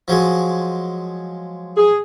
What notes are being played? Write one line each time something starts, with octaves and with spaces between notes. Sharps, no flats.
F3 F#3 G#3
G#4